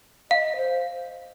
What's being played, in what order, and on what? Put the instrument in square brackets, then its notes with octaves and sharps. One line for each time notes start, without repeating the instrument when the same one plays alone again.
[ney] D#5 [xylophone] F5
[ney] C5